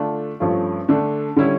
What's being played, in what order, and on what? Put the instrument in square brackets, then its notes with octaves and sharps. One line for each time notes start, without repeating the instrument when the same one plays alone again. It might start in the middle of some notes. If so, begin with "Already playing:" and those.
Already playing: [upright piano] D3 A3 D4 F4
G2 F3 A3 C#4 F4
D3 A3 D4 A4
D3 G3 C#4 E4